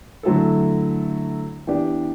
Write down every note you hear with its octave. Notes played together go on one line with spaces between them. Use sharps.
D3 F#3 A3 E4 A4
E3 B3 D4 G4 D5